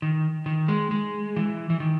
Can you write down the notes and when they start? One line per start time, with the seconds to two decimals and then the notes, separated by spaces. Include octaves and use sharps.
0.02 D#3
0.46 D#3
0.68 G#3
0.91 G#3
1.36 E3
1.70 E3
1.80 D#3